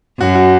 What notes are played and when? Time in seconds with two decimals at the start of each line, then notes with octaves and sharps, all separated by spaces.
0.20 F#2 F#4
0.35 F#4